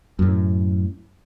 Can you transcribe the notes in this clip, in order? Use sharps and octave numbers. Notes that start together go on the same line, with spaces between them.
F#2 A2